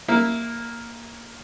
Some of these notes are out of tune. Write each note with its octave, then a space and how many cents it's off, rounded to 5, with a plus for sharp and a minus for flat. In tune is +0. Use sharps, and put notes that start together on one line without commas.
A#3 +0 E4 +0